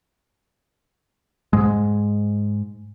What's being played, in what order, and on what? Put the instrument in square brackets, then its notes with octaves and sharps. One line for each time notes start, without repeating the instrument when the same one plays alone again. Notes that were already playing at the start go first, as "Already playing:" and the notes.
[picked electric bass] G#2 G#3